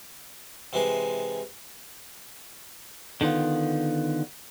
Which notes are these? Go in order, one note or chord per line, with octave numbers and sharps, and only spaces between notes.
C3 E3 G#3 C6
D3 D#3 B3 F4